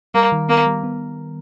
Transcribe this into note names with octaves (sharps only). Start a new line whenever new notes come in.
G3 A#3
D#3
A#3 B3
G3
B3